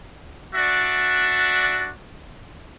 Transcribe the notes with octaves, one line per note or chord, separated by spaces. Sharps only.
D4 F#4 D5 E5